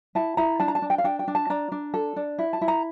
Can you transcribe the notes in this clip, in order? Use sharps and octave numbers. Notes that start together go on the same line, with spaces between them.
E4 A5
E4 A#5
D4 A5
A#5
A5
D4
G5
F5
D4 G5
G5
D4
A5
D4 A#5
D4
A4
D4
E4
A5
E4
A#5